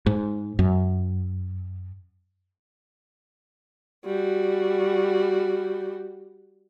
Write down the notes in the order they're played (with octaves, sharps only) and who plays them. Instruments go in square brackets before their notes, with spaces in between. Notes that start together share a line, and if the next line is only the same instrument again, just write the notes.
[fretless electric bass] G#2
F#2
[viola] G3 F#4